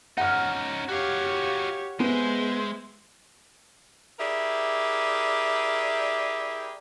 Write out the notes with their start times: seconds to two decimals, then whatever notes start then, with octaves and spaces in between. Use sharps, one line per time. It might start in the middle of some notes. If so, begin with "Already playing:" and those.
0.18 C#4 D#4 F#5 F6
0.89 F#4 G4 C#5 F5
2.00 G#3 B3 C5 E5
4.19 E4 G4 G#4 A#4 D5 E5